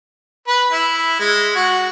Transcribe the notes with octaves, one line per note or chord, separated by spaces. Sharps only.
B4
E4
G#3
F#4